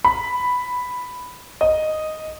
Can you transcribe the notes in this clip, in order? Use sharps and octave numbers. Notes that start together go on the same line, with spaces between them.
B5
D#5